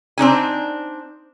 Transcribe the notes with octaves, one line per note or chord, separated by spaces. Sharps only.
C4 D4 D#4 G#5